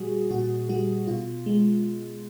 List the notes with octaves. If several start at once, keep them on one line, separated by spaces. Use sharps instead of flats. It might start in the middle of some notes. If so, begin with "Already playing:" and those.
Already playing: A#2 G3 F#4 G#4
A#2 F#4
G3 F#4
B2 F4
G#3